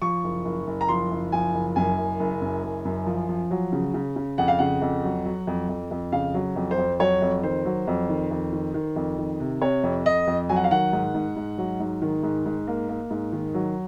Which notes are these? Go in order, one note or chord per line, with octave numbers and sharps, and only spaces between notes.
F3 C#6
F#1
F#1
F#1
A#5
F3 C6
F#1
F3 G#5
F#1
F#2 G#5
F#1
F#1
F#2
F#1
F#2
F3
F3
F#3
C#3
C#3
C#3
F2 F#5
F5
C#3 F#5
F2
F#3
F#3
F2
F2
F2
C#3 F5
F#3
F2
C5
F2
F#3 C#5
F2
D#3 C5
F#3
F2
D#3
F2
D#3
D#3
F2
D#3
C3
C3 C#5
F2
F2 D#5
F2
F#3 G#5
F#5
F5
D#3 F#5
G#2
G#2
G#2
F#3
G#2
D#3
G#2
G#2
A#3
A#3
G#2
D#3
F#3